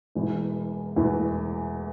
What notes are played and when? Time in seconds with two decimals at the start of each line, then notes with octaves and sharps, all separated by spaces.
0.15 E1 E2 E3
0.96 E1 E2 E3